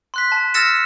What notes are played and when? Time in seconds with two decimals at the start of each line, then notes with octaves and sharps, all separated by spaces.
0.14 C6 F#6 B6
0.32 A5
0.54 E6 F6 A6 A#6 C#7 E7